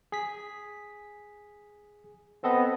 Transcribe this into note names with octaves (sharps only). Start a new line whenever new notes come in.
G#4 B6
B3 C4 A4 D#5